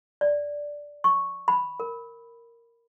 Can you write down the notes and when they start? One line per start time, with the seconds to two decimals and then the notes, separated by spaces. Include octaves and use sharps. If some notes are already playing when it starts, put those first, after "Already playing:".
0.21 D5
1.04 C#6
1.48 B5
1.80 A#4